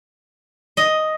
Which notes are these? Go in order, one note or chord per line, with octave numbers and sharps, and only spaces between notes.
D#5